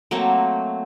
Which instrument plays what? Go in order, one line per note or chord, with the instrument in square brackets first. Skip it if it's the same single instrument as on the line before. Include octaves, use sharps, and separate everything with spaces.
[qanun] F#3 A3 A#3 C4